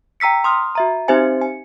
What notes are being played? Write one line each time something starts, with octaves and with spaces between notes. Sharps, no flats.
G5 A#5 E6 B6 C#7
C6 D#6 F6
F#4 E5 A#5
C4 D#4 G4 C5 E5 G#5
G#5